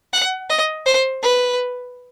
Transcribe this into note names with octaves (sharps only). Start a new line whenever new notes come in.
F#5
D#5
C5
B4